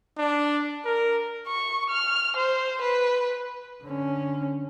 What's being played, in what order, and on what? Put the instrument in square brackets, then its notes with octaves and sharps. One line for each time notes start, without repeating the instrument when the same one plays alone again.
[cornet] D4
A#4
[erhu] C#6
F6
C5
B4
[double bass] D3 C#4